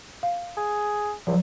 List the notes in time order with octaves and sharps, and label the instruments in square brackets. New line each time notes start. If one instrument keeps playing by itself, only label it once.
[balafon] F5
[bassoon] G#4
[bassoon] C#2 [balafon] F3 F#3